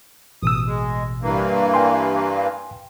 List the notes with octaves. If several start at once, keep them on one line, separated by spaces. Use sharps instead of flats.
A1 B2 D#6 E6
G#3
G2 E3 A#3
G5 G#5 C6